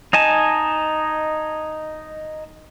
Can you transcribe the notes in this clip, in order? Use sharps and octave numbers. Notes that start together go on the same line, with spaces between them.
D#4 D#5 G#5 A5